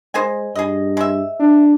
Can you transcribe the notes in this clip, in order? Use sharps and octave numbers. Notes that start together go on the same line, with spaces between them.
G#3 C5 D#5 G#5
G2 G#4 D#5
G#3 E5
D4